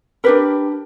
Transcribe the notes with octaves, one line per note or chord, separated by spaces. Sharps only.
D4 G4 A#4 B4